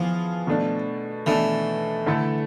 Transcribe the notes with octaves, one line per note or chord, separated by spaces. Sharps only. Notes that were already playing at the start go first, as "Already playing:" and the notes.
Already playing: E3 F3 B3 F4 G#4
B2 A3 D4 A4
B2 E3 A3 D4 A4
D3 A3 E4 A4